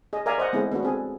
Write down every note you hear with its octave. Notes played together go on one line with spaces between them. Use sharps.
G#4 D#5
A#4 D5 E5 F5 G#5 A#5
C5 D#5 F#5
G#3 A3 B3 C4 E4 G#4
B3 D4 F#4
C4 G#4 A4